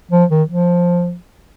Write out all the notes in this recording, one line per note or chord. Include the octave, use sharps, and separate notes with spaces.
F3
D#3
F3